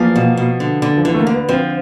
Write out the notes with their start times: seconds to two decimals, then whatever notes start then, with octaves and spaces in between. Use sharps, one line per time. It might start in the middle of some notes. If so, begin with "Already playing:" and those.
Already playing: E2 F3 A#3
0.16 B2
0.37 B2
0.60 D3
0.82 D3
0.97 F3
1.05 D3 E3
1.14 A3
1.19 A#3
1.27 D3
1.34 B3
1.49 F3 C4